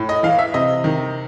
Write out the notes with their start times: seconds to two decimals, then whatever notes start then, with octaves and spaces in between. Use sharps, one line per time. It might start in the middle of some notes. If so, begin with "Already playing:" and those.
Already playing: A2
0.09 D#5
0.23 E3 F5
0.39 E5
0.54 C3 D#5
0.84 D#3